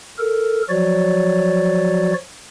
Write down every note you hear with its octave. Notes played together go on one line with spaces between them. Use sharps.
A4 A#4
F3 F#3 F#4 C#5 D5